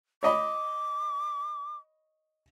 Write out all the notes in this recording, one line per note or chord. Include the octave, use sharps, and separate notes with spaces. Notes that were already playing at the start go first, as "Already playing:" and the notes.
C#5 D#5 B5 D6